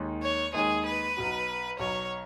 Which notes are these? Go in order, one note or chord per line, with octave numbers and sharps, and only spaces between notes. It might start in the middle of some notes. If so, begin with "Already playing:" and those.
Already playing: D#2 D#3 G#3 D#4
C#5
D#2 D#3 G#3 D#4 G#4
B4
B1 B2 F#3
B1 B2 F#3 C#5